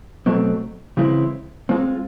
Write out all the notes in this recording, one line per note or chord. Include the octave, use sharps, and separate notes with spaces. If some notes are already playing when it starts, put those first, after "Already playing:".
B2 F#3 A3 C4
C#3 E3 G#3 C4 E4
G#3 C4 F4 G#4